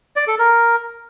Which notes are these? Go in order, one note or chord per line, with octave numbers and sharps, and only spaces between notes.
D5
A4
A#4